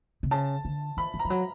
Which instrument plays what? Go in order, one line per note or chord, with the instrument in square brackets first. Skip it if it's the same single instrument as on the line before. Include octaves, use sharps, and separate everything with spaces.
[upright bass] C3
[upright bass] C#3 [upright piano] A5
[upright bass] D3
[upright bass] E3 [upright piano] B5
[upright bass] F3
[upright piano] A#5
[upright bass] F3
F#3